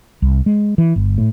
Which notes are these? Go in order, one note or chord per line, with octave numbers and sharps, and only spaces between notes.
C2
G#3
E3
G1
A2